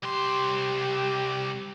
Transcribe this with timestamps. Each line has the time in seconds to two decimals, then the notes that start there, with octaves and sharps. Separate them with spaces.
0.03 C2 G4 C6